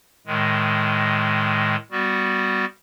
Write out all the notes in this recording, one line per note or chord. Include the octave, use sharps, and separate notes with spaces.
A2 D#3 G#3
G3 B3 F#4